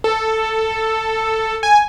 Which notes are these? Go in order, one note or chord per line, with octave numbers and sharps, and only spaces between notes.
A4
G#5